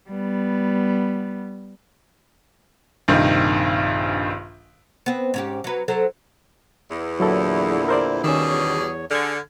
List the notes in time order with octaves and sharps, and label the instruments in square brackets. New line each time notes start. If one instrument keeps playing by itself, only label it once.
[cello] G3 B3
[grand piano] A#1 G2 C3 D#3
[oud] B3 C4
G#2 C#4 G4
F#3 B4
F#3 A4 C5
[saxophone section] E2
[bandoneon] A#2 D3 E4 [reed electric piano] F#3 A4
[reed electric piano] A#4 C5 D5
[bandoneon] D#2 E6 [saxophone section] B2 G3 G#4 [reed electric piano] D#3 C#4
[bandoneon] E2 C#5
[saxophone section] D3 [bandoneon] G#4 [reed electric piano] F6 G#6